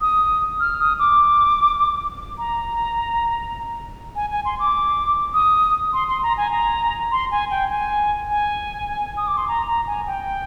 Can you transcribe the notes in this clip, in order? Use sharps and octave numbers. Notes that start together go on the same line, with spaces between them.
D#6
F6
D#6
D6
A#5
G#5
G#5
C6
D6
D#6
C6
C6
A#5
G#5
A#5
C6
G#5
G5
G#5
G#5
D#6
D6
C6
A#5
A#5
G#5
G5